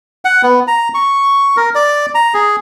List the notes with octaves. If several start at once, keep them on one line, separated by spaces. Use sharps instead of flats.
F#5
B3
A#5
C#6
A#4
D5
A#5
G#4